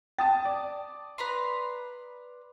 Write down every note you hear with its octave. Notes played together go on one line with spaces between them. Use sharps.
G5 A5 D#6 A6
D5
B4 A#5 C6